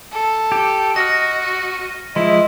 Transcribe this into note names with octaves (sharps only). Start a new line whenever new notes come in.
A4
G4
F#4 D#5 F6 A#6
F3 G#3 E4 D#5 C6